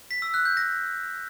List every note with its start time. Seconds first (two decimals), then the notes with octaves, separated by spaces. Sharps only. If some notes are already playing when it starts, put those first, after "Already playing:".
0.11 B6
0.22 E6
0.34 F#6
0.45 G6
0.57 A#6